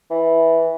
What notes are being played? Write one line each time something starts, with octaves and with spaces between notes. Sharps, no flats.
E3